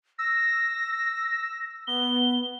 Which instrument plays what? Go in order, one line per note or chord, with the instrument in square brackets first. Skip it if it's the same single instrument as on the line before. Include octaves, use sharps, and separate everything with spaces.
[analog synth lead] E6 [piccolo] A#6
[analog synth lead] B3 [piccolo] G7